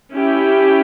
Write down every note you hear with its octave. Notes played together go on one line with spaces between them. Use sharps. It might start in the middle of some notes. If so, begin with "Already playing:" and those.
C#4 E4 G4